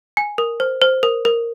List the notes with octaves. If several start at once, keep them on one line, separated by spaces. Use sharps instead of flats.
G#5
A#4
C5
C5
A#4
A#4